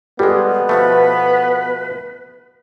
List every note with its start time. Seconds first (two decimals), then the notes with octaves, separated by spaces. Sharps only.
0.19 G3 G#3 B3 G4 A4
0.69 B2 F3 A3 B4